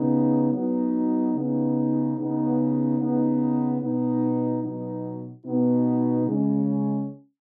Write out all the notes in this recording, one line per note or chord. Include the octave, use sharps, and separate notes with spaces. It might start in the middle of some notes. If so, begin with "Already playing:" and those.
Already playing: C#3 B3 D#4
F#3 B3 D#4
C#3 B3 D#4
C#3 B3 D#4
C#3 B3 D#4
B2 B3 D#4
B2 F#3 B3 D#4
B2 B3 D#4
C#3 G#3 C#4